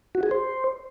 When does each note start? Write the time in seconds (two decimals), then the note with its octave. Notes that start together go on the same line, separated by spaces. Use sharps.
0.15 F#4
0.23 G#4
0.31 C5